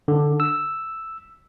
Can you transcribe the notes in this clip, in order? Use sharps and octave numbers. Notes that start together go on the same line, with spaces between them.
D3
E6